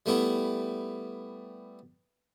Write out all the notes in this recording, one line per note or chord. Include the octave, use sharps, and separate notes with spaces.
G3 A3 B3 E4